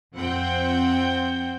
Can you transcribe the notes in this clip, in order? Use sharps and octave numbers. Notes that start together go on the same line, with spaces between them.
F2 F3 C4 F#5 G5 G6